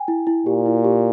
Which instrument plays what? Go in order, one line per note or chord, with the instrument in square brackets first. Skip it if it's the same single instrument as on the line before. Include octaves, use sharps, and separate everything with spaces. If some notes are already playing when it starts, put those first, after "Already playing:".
Already playing: [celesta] G5 G#5
E4
E4
[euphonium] A#2 [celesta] G4
[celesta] E4
G4